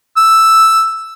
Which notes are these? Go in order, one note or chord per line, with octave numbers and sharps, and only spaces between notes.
E6